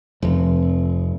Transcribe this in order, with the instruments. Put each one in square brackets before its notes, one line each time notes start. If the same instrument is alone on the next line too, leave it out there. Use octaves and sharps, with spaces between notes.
[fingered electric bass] F1 F2